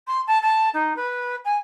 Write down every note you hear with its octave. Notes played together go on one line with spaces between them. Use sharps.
C6
A5
A5
D#4
B4
G#5